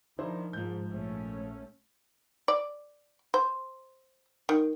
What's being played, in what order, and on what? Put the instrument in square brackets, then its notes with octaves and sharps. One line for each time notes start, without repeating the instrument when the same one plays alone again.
[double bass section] D#3 F3 [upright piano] D4 E4 C5
[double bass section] G#2 [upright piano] F3 G6
[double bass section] A#1 A3 C#4
[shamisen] D5
C5
D#3